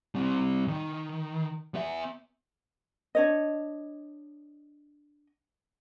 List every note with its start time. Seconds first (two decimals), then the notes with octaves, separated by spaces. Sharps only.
0.15 G3 C4
0.68 D#3
1.74 B3 E5
3.15 D4 C#5 D#5